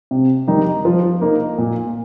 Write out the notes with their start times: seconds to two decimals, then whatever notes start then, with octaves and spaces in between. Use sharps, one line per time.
0.11 C3
0.47 D#3 G3 D#4
0.85 F3
1.21 A#3 D#4
1.58 A#2